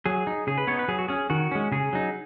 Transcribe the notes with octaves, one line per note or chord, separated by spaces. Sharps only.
F#3 G#4
D#4
C#3 G#4
B4
B3 D#4 C#5
B4
F#3 G#4
F#4
C#4 G#4
D#3 F#4
G#3 C#4
C#3 G#4
F#3 D#4